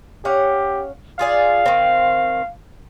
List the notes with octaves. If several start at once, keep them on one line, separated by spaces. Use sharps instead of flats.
C#4 G4 F5 F#5
F4 G#4 D5 F5
D#3 C4